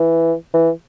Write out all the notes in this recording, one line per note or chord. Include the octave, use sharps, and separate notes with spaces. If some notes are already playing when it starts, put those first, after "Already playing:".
Already playing: E3
E3